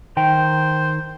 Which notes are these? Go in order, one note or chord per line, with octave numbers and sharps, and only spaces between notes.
D#3 C5 G5